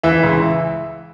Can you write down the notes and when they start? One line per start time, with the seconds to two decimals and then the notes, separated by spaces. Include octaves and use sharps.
0.03 E3 E5
0.23 C#2